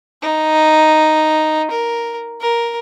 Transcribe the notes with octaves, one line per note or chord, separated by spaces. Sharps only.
D#4
A#4
A#4